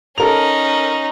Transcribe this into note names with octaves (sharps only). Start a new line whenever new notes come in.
C#4 D#4 A4 A#4 F7